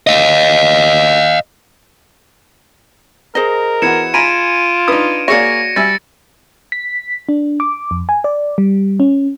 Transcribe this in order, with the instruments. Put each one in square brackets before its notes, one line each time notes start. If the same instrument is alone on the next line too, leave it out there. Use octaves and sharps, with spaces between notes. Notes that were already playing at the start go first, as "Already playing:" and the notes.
[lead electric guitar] D#5 F5
[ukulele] G#4 C5 D#5 [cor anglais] A#4
[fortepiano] E3 B3 F#4 [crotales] G#6 C#7 E7
[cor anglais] F4 [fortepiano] G#5 A#5 B5 [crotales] D7 D#7
[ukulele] D4 B4 [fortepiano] D#4 D#6
[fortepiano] A#3 G#4 C#5 [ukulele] F#4 D5 [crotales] A#6 C#7
[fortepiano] G3 E5 G#5 [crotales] A6
[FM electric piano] B6
D4
D6
F2
G#5
D5
G3
C#4